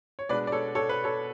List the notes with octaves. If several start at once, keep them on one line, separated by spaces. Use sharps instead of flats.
C#5
B2 G#3 D4 B4 D5
D5
A4 C#5
A4 C#5
B4
A4 C#5